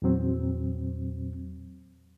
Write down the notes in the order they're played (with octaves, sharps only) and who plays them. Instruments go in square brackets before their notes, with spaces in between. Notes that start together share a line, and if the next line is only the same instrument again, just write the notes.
[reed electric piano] E2 A#2 F#3 C4